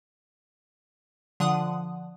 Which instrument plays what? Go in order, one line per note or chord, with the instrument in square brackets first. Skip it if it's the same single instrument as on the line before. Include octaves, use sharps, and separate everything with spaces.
[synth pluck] D3 F3 F#5 D#6